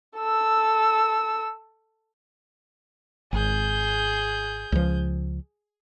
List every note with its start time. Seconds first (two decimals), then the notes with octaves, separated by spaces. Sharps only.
0.18 A4 E6
3.33 G#1 G#4 G6
4.72 C#2 F3